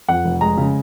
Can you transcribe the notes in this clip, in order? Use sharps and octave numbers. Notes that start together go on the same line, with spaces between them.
F2 F#5
F1
G#3 A#5
C#3